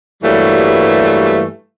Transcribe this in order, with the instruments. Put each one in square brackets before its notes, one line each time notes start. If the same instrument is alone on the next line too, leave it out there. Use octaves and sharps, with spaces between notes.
[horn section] G2 E3 F#3 G3 A3 A#3